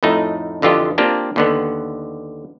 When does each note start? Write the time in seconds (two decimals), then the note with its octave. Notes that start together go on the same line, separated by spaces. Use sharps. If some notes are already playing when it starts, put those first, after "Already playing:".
0.03 F2 A2 A3 D#4
0.62 F2 D3 E3 F4 G4 D#5
0.98 A#3 C4 D4 F4 G4
1.36 D#2 D3 B3